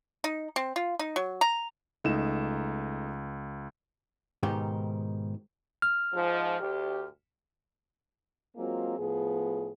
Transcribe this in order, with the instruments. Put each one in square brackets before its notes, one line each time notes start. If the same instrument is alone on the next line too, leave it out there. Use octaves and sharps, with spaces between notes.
[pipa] D#4
C4
F4
D#4
F#3
A#5
[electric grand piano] C#2 E7 [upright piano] A3 D#4
[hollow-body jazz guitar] G#2 B2 D#3 G4
[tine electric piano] F6
[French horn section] G#2 F3
D2 G4
F#3 G#3 A#3 C4 F4
A2 F3 B3 G#4